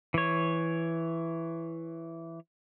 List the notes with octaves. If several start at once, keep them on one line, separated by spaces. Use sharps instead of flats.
E3 C#5